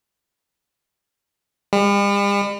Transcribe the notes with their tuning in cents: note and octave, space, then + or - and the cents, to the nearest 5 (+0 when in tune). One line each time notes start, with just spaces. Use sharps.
G3 +45